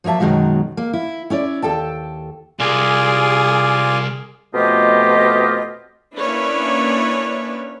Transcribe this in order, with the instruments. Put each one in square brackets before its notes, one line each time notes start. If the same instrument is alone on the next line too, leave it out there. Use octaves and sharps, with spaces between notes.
[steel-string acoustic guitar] F3 F#3 A#3 E5 A5
F#2 B2 D#3 F#3 G#3
A#3
E4
C#4 E4 C#5 D5
D#2 A4 G5 A5
[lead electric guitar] C2 [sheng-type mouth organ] F4 D5 G#5 [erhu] G#4
[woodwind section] F2 B2 A3 F4 G4 D#5
[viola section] A#3 C#4 D4 E4 B4 C#5